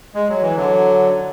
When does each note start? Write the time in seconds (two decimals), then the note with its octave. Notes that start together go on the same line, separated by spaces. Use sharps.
0.14 G#3
0.29 F#3
0.42 E3
0.56 D3 F#3